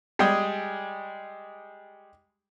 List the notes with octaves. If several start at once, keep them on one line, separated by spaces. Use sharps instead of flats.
G3 G#3 G#4 G5 D#6